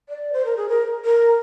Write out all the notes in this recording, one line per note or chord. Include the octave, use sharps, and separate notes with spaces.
D5
C5
A#4
G#4
A#4
A#4